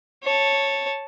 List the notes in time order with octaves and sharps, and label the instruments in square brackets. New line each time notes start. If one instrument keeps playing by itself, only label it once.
[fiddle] C#5 A5